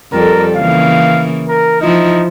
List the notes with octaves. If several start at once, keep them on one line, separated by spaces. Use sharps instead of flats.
F2 G3 A4 A#4
C#3 E3 A#3 F5
A#4
F3 D#4 E4